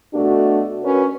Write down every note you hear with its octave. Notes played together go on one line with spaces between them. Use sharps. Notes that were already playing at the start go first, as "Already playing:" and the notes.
B2 A3 D4 F#4
C#4 F#4 A#4 B4 C#5